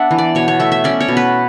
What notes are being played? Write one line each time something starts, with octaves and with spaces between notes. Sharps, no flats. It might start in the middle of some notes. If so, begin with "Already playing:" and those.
Already playing: B3 D4 E5 F#5
E3
D5
B2 C#5
C#5
A3 E5
E5
C#4 D5
C#5
B2
B4